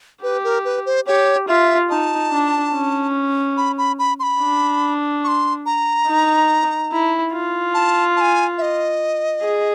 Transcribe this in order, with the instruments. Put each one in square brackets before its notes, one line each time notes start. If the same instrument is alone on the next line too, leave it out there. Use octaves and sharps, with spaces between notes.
[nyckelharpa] G4 [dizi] B4
[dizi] A#4
B4
C5
[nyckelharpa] G4 [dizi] C#5
[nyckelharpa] F4 [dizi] E5
[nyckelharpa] D#4 [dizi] A5
[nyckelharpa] D4
C#4
[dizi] B5
B5
B5
C6
B5
[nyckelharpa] D4
[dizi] C#6
C6
A#5
[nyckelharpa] D#4
E4
F4
[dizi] A5
A5
G#5
E5
D#5
[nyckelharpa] G#4